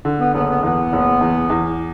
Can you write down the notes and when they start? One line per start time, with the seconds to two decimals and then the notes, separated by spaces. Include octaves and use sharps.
0.05 D3
0.20 B3
0.34 F#1 B3
0.49 B3
0.63 E2 B3
0.93 F#1
1.21 E2
1.50 E2